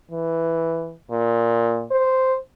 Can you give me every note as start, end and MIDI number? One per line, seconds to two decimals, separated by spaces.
0.11 0.95 52
1.11 1.85 46
1.91 2.36 72